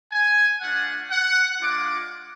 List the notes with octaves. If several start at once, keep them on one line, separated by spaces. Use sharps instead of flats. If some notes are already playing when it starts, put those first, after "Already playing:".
G#5
A3 D4 F4 F#5
F#5
G#3 D4 F4 D6